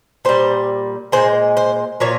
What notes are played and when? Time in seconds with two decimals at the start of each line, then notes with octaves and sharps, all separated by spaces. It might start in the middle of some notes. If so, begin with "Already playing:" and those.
0.25 A#2 G3 C5
1.12 A#2 G#3 C5
1.57 C5
2.00 A#2 F3 C#5